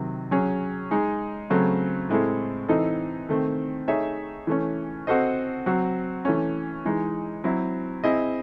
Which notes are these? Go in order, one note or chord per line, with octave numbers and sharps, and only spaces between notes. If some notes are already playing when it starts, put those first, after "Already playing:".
Already playing: C3 D#3 F#3
F#3 C#4 G#4
G#3 D#4 G#4
C#3 F#3 A3 C4
A2 G#3 C4 E4 A4
E3 C4 D#4 A4 D#5
D#3 A3 C4
A3 D#4 G#4 C#5 E5
E3 A3 C#4
C4 F#4 A4 C5 D#5
F#3 C4 F#4
E3 A3 C#4
E3 G#3 D#4
F#3 C4 E4
C4 E4 G#4 D#5